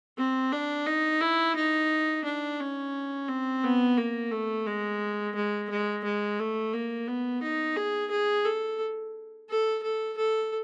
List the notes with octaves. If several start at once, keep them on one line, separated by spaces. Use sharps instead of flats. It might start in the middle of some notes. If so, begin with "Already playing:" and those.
C4
D4
D#4
E4
D#4
D4
C#4
C4
B3
A#3
A3
G#3
G#3
G#3
G#3
A3
A#3
B3
D#4
G#4
G#4
A4
A4
A4
A4